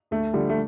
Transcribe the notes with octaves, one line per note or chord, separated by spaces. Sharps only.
D2 A3
D3 F3 G3
A3